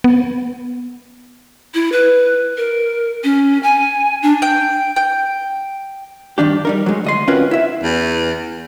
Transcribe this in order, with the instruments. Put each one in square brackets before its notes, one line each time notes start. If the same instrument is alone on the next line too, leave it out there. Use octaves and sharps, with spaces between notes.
[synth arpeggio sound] B3
[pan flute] E4
B4
A#4
C#4
G#5
D4
[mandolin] G5
G5
[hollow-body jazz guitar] G2 D#3 D4 G4
G3 D#4 A#4
F#3 G#3
D2 D#5 C6
C4 C#4 F4 F#4 A#4 B4
E4 E5
[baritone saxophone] E2